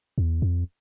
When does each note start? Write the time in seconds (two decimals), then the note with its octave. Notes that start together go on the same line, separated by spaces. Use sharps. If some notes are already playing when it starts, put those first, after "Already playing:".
0.18 E2
0.42 F2